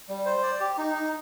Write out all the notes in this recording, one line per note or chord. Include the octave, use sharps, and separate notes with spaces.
G3
C5
D5
G4
D#4
D#4